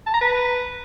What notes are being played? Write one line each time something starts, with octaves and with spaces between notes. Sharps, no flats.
A5
A#5
B4